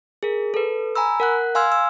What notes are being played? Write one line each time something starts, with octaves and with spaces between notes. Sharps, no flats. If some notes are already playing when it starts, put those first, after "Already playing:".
G#4 A#4
A4 B4
G#5 A#5 B5 E6
A#4 F#5 F#6
F5 G#5 C6 E6 F6 G#6
E6